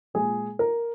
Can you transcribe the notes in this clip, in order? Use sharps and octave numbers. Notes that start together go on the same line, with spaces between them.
A#2 G#3 G#4
A#4